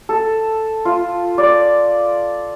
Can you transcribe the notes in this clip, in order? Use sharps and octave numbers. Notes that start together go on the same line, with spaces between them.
A4
F4
D5